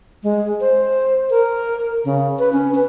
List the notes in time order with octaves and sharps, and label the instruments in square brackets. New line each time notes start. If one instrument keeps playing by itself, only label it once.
[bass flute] G#3
C5
A#4
C#3
B4
C#4
B4